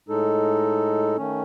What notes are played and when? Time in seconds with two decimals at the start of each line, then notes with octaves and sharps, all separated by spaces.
0.08 A2 G#3 D#4 A4
1.17 D#3 A3 C#4